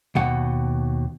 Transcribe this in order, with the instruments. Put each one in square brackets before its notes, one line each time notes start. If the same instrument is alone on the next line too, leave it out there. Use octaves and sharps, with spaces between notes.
[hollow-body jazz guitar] D#2 B2 F#5